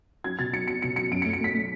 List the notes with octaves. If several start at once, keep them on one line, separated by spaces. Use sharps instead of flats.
F#3 G#6
B2 A6
F#3 C#7
F#3 C#7
B2 C#7
F#3 C#7
F#2 D7
C#7
A3
C#7
A3 B6
A3